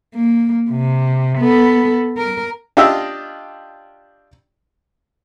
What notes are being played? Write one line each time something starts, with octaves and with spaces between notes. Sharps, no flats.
A#3
C3
B3 A4
A#4
D4 F4 G4 D#5 E5